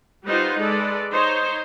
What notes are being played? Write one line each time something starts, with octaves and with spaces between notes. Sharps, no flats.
G3 D#4 F4 B4 C5 F#5
G#3 A4 B4 D5
D#4 C5 C#5